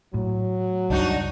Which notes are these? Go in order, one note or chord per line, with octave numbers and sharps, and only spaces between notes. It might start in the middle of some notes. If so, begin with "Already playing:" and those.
A2 F#3
C#2 G2 D4 D#4 F#4